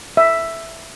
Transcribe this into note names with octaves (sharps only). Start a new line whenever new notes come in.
E5